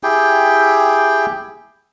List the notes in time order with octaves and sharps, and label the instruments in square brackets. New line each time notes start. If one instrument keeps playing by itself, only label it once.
[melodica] E4 G4 G#4 G5